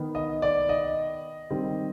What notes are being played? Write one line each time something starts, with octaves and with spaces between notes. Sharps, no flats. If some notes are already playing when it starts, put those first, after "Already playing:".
Already playing: D#3 B3
D#5
D5
D#5
D#3 G3 C4